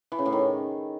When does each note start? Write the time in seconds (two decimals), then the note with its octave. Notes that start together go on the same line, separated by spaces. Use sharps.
0.12 E3
0.19 C#3
0.26 A2
0.32 D#3